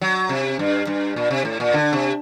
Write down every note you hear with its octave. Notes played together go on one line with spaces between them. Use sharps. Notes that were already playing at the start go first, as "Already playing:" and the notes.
F#3
C3
G2
G2
A#2
C3
A2
A#2
D3
C3